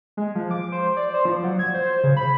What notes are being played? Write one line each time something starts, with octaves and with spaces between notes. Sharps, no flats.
G#3
F3
D6
C5
D5
C5
F3
F#3
G#6
C5
C#3
B5